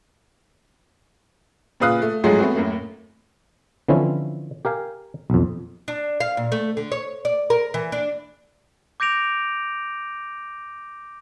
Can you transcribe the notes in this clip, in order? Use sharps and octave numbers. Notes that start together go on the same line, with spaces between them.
A#2 C#3 B4 F5 D#6 F#6
A3
D2 G#2 F3 F#3 G#3 A3
A3 B3 C4 F#4
F#2 A2 A#3
D3 E3 F3 C4 C#4 E4
G4 A#4 F5 G#5
B1 F2
D4
F5
A#2
A3
D3
C#5
D5
A#4
E3
D4
D6 G6 A#6 D7 F7